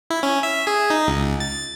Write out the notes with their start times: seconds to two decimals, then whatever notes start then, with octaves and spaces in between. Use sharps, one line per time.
0.10 E4
0.23 C#4
0.43 E5
0.67 G#4
0.90 D#4
1.07 C#2
1.40 A6